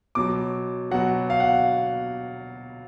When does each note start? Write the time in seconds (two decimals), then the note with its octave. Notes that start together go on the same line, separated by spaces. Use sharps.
0.15 B2 F#3 D6
0.91 B2 F#3 F#5
1.30 F5
1.40 F#5